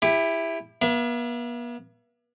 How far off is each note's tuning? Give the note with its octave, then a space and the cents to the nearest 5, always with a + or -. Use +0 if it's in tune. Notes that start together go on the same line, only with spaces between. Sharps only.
E4 +0 G4 +30
B3 -45 E5 +35